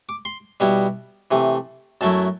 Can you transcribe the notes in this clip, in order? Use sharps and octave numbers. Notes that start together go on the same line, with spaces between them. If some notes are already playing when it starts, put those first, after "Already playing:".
D6
C6
B2 G3 B3 E4
C3 E3 A3
F#2 F#3 A3 E4 A5